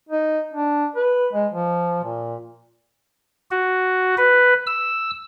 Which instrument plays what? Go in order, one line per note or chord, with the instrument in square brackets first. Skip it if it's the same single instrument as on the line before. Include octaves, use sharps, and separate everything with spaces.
[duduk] D#4
D4
B4
G#3
F3
A#2
[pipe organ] F#4
B4
E6